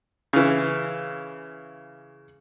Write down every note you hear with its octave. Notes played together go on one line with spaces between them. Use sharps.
C#3 E3